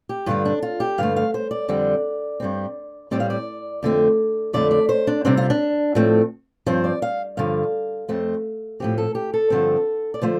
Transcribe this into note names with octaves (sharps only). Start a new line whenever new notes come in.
G4
G2 D3 G3 F4
D4
F4
G4
G2 D3 A3 F5
F5
C5
D5
F2 D3 G3 C4
G2 G3 C4
A2 G3 C4 D5
F5
D5
F2 D3 A3 C4
F2 D3 A3 D5
D5
C5
D4
C3 G3 C4 D4
F4
D4
A2 F3 A3 C4
G2 F3 C4 C5
D5
F5
G2 D3 F3 F5
F2 F3 A3 C4
A2 F3 C4 G4
A4
G4
A4
G2 D3 F3 C4
D5
D3 F3 A3 C5